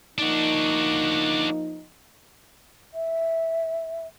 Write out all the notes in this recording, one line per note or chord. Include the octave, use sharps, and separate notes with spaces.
F3 A#3 D4 D#4 F#4
E5